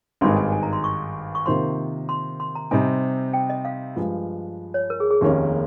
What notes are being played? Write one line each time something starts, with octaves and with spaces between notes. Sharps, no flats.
G#1 G2 D#3 G#3 C6
G#5
G#5
A#5
C6
C#6
C#6
C3 D#3 A#3 F4 C5 C6
C6
C6
A#5
C3 G3 C4 D#4 G#5
G5
D#5
F5
G2 F3 G#3
C#5
A#4
G#4
G#4
F1 D#2 D#3 A#3 C#4 G4